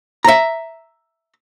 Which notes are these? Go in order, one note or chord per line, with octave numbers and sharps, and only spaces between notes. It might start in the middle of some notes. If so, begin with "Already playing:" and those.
E5 A#5